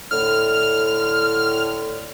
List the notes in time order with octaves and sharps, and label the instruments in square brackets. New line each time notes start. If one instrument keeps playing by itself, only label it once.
[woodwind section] A2 D3 [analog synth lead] F6